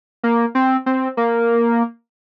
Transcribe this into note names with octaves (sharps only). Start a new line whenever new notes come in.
A#3
C4
C4
A#3